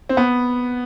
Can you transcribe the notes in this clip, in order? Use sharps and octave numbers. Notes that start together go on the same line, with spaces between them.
C4
B3